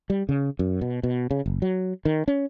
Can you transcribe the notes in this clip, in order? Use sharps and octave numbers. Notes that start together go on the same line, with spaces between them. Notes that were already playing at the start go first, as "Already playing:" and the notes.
G3
C#3
F#2
B2
B2
C#3
F#1
F#3
D#3
C#4